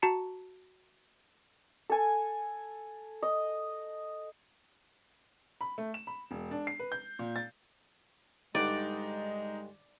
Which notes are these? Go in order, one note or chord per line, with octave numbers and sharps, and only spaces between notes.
F#4 A5 A#5 C#7
A4 G#5
D#5
B5
A3
E7
B5
E1
D4
C7
B4
G6
A#2
A6
G2 D3 G#3 D#4 D5 F#5